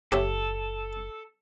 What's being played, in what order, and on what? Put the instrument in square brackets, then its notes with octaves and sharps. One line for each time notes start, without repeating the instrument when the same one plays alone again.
[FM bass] F#1 [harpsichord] G4 C#5 E5 [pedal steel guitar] A4